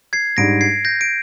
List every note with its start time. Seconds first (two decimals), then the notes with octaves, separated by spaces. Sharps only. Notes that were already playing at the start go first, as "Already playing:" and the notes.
0.13 G#6 C7
0.37 G#2 G3 D4 A#6 D7
0.61 G#6 C7
0.85 G6 A#6
1.01 D7